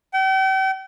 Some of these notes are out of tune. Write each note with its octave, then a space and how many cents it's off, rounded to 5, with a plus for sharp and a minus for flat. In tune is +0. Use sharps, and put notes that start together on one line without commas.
G5 -40